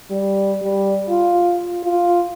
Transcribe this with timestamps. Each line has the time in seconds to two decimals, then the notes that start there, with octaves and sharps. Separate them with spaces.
0.11 G3
0.63 G3
1.09 F4
1.84 F4